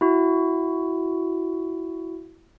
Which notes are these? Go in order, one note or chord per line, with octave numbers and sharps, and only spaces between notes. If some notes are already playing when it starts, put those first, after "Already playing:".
E4 F#4